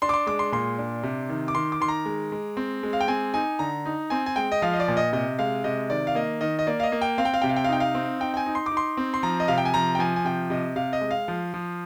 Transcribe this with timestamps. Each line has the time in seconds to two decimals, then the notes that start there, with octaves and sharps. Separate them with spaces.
0.02 D4 C6
0.09 D6
0.14 C6
0.27 G#3 D6
0.39 C6
0.52 A#2 C6
0.78 D4
1.03 C3
1.29 D#3
1.48 D6
1.55 D#3 C6
1.72 D6
1.80 D#3 C6
1.88 A#5
2.06 G#3
2.32 G#3
2.57 C4
2.83 G#3
2.93 F5
3.00 G5
3.08 C4 G#5
3.34 D#4 G#5
3.59 D3 A#5
3.86 D#4
4.10 C4 G#5
4.26 G#5
4.36 G#3 G5
4.52 D#5
4.62 F3 F5
4.73 D#5
4.80 D5
4.88 A#2
4.97 D#5
5.13 C3 D#5
5.39 G#3 F5
5.64 C3 D#5
5.90 D#3 D5
6.07 F5
6.15 A#3 D#5
6.41 D#3 D#5
6.59 D#5
6.67 A#3 D5
6.80 F5
6.83 D#5
6.92 A#3
7.02 G5
7.18 C4 F5
7.25 G5
7.34 F5
7.42 C3 G5
7.49 F5
7.56 G5
7.64 F5
7.69 D#4 G5
7.80 F5
7.95 C4
8.20 D#4 G5
8.34 G5
8.37 G#5
8.46 D#4
8.55 C6
8.66 D6
8.71 D#4
8.77 C6
8.97 C4
9.14 C6
9.23 F3 A#5
9.40 D#5
9.48 C3 F5
9.58 G5
9.65 G#5
9.74 F3 A#5
9.95 G5
9.99 F3 G#5
10.16 G#5
10.24 C3 G5
10.50 C3 D#5
10.76 C3 F5
10.93 D#5
11.01 G#3
11.11 F5
11.28 F3
11.54 F3